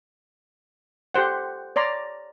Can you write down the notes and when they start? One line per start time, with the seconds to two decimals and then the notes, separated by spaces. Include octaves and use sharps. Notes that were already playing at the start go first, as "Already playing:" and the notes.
1.14 G4 A4 C5 F#5
1.76 C#5 D5 A#5 C6